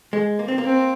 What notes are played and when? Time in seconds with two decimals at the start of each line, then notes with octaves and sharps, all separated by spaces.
0.13 G#3
0.39 A#3
0.48 C4
0.58 A#3
0.64 C4